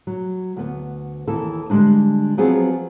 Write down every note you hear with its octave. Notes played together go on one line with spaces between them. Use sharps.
F#3
D2 B3
D#2 E3 A4
D3 G3 G#3 D4 D#4
F3 F#3 B3 C4 G#4